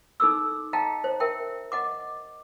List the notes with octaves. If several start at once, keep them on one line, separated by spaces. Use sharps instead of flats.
D#4 A4 D6 E6
D#5 F5 G5 A5 A#5
C5
A#4 E5 G5
D#5 F#5 D6